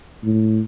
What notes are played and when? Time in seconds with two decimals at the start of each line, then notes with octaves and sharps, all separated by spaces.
0.24 A2